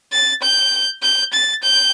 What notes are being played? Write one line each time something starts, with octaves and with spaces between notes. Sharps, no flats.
A6
G6
G6
A6
G6